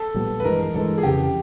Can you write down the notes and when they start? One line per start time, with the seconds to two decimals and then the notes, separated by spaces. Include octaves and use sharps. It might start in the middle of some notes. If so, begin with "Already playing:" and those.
Already playing: A4
0.14 A#1 A#2 G3 B3
0.40 B4
0.44 G2 E3 G#3 A#4
0.74 G2 E3 G#3 A4
0.98 G#4
1.03 F2 C#3 E3 G4